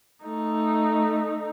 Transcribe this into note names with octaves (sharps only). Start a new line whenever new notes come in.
A3 D#4